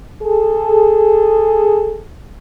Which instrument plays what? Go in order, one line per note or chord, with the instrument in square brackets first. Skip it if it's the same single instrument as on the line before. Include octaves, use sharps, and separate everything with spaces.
[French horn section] G#4 A4